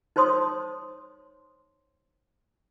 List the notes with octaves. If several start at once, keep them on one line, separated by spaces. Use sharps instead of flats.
D#4 C5 C#5 C6 D#6